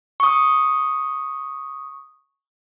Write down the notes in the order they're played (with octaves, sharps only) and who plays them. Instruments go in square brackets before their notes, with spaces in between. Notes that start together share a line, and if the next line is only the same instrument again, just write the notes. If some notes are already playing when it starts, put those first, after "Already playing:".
[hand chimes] C#6 D#6